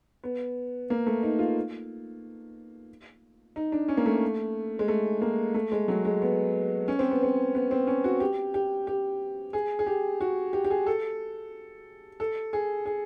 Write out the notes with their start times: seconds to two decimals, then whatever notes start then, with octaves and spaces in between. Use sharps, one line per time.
0.24 B3
0.90 A#3
1.06 A3
1.23 D#4
1.39 F4
3.56 D#4
3.72 D4
3.88 C#4
3.97 A#3
4.06 A3
4.79 G#3
4.88 A3
5.22 A#3
5.54 A3
5.72 G#3
5.88 F#3
6.05 G#3
6.22 B3
6.88 C#4
6.99 C4
7.11 B3
7.23 C4
7.55 B3
7.71 C4
7.87 C#4
8.04 F#4
8.20 G4
8.54 G4
8.87 G4
9.53 G#4
9.79 G#4
9.86 G4
10.21 F#4
10.53 G4
10.64 G4
10.70 G#4
10.87 A4
12.20 A4
12.53 G#4
12.86 G#4